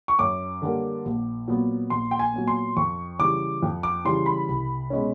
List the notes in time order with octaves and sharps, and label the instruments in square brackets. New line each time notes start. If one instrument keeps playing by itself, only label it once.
[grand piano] C#6
F#2 D6
D3 G3 A#3
A#1
A#2 F#3 B3
A#1 C6
G5
G#5
A#2 F#3 B3
C6
F2 C#6
C#3 E3 G3 D6
F2
D6
C#3 E3 G3 C6
B5
C2
B2 G#3 C#4